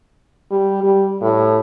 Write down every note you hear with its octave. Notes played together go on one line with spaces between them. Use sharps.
G3
G3
A2